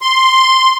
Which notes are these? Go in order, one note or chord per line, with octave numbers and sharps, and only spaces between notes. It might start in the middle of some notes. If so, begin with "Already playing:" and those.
C6